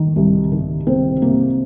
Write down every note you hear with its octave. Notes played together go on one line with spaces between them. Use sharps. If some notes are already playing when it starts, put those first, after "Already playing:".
Already playing: D#3
C2
D#3
C3 C4
C3 A#3